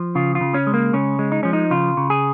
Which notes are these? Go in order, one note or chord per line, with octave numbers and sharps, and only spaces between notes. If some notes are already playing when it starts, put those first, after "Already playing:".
Already playing: F3
C#3 F4
F4
C#3
C#4
G#3
A#3
C#3 C#4
G#3
D#4
F3 C#4
D#4
C#3 F4
C#3
G#4